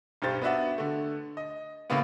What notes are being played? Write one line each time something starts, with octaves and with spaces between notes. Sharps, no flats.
B1 G2 G4 C5 A6
B3 D4 F#4 E5 F#5
D3 A3
D#5
C#2 A2 C#3 A#3 B3